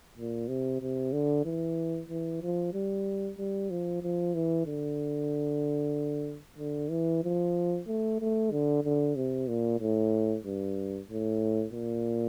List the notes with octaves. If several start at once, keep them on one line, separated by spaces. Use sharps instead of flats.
A#2
C3
C3
D3
E3
E3
F3
G3
G3
F3
F3
E3
D3
D3
E3
F3
A3
A3
D3
D3
C3
A#2
A2
G2
A2
A#2